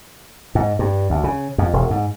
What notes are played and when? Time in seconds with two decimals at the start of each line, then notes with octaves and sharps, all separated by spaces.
0.55 G#2
0.79 G2
1.10 D2
1.24 C#3
1.58 F2
1.73 E1
1.91 G#2